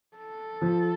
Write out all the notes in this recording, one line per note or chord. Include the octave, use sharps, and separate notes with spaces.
A4
F3